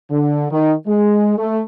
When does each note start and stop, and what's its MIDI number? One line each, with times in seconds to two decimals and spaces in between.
0.10 0.45 50
0.51 0.72 51
0.86 1.33 56
1.37 1.60 57